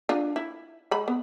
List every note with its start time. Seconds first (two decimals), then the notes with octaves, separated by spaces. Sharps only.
0.09 D4 F4
0.36 E4
0.91 G#3 B5
1.08 B3